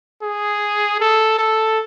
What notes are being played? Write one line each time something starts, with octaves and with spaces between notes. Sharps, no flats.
G#4
A4
A4